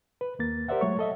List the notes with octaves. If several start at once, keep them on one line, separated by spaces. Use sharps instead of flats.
B4
D#2 A#3 A6
G4 A#4 C5 D5 E5 F#5
F#3 G#3 A3 C#5 C#6
A4 D#5 E5